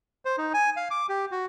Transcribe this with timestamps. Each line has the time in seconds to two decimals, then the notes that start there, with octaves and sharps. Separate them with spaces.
0.25 C5
0.38 D#4
0.54 G#5
0.76 F5
0.91 D6
1.09 G4
1.31 F#4